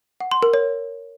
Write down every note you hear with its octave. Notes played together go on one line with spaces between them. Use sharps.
F#5
C6
A#4
C#5